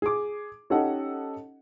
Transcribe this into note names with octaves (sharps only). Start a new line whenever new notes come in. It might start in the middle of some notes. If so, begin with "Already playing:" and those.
G#4 D6
C#4 D#4 G4 A4 D#5 F#5